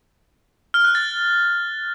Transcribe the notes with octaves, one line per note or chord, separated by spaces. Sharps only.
F6
F#6
A6